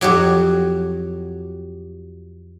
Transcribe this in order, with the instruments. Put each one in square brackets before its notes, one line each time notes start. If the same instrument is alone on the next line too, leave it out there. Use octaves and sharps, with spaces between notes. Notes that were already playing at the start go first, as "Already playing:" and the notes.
[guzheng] F2 F#3 F#4 G4